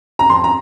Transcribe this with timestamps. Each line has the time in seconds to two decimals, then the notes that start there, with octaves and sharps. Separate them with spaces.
0.19 A#5
0.29 F2 C6
0.44 A#5